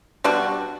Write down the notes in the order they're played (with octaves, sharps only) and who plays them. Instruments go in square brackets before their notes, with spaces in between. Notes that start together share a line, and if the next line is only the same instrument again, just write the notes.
[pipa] B2 G3 D4 F#4